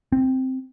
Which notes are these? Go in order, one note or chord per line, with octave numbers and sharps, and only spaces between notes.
C4